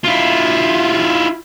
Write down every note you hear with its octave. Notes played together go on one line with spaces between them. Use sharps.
E4 F4